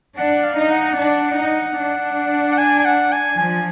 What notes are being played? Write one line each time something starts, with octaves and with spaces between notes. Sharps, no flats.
D4 F#5
F5
D#4
F#5
D4
D#4
D4
F#5
G#5
G#5
F#5
G#5
F3 G#5